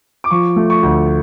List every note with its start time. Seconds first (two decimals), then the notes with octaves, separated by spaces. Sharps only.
0.24 D6
0.31 F3 C#6
0.56 A3
0.70 C#6
0.83 D2